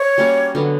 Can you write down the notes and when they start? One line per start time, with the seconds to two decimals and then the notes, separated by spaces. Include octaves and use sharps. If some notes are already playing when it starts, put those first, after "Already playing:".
Already playing: C#5
0.18 G3 A#3 C#4 F#4
0.55 D3 F#3 B3